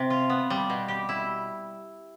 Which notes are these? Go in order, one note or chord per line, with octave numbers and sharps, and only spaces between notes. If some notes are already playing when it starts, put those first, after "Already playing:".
Already playing: C3
F4
B3
G3
B2
G4
E4